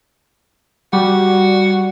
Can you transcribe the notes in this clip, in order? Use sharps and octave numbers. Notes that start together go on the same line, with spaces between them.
G3 F#4